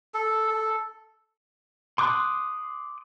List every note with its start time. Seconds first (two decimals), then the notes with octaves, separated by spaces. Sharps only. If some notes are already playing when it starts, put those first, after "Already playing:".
0.14 A4
0.50 A4
1.98 C6 D6 D#6 F#6